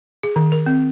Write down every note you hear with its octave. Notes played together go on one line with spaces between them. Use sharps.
G#4
D#3
A#4
C4